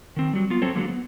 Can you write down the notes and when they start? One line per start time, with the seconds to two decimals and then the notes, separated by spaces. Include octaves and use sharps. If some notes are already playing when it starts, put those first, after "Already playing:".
0.16 D#3 C4
0.33 F#3 G3
0.50 B3 F4
0.62 F#3 C4 A4 C5 C#5
0.76 D3 F#3 G#3 A#3
0.88 B3